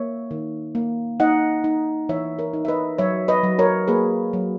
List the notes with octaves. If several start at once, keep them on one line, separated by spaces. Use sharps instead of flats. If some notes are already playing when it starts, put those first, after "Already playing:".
Already playing: A#3 C#5 E5
D#3
A#3
D#4 D#5 F#5
D#4
E3 C#5 E5
A#4 C#5
D#4
E5
B4 D#5
F#3 C#5 E5
B4 D#5
F#3
A#4 C#5
A#3 G#4 B4
F#3